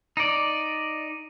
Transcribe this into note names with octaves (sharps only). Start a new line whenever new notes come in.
D#4 D5